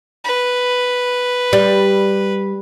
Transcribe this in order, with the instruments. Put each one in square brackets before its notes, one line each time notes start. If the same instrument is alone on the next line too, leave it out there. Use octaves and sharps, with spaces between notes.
[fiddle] B4
[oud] G3